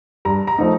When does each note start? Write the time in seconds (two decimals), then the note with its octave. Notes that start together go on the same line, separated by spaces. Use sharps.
0.25 G2 A#5
0.47 A#5
0.58 F3 A3 D#4